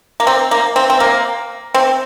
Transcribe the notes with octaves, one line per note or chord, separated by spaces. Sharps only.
A#3
C4
A#3
C4
C4
A#3
C4